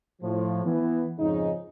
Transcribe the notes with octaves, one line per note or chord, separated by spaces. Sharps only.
A2 F3
E3 B3
F2 G#2 C#3 D#4